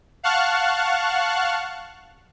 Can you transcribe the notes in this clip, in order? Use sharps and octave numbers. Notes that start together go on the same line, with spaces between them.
F5 F#5 A5 C#6 F6 F#6